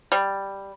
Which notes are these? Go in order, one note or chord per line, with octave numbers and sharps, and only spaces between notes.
G3